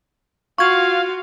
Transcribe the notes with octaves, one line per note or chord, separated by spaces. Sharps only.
F4 F#4 F5 C#6 G#6